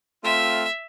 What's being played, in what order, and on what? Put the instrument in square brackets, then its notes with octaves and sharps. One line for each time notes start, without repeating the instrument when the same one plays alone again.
[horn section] A3 C4 F4 [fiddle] E5